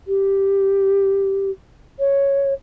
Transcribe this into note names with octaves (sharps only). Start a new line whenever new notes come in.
G4
C#5